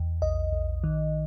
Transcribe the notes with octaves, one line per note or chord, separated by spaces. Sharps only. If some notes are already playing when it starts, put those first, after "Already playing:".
Already playing: E2
A#1 D#5
A#1
D#3